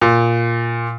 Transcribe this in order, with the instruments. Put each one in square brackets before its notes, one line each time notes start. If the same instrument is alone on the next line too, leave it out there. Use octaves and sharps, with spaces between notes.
[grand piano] A#2